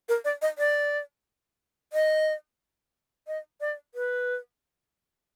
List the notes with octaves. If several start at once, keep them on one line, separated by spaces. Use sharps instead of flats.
A#4
D5
D#5
D5
D#5
D#5
D5
B4